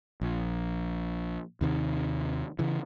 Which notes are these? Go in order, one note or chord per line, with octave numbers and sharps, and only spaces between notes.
A#1
D#2 C3 D#3
C#3 E3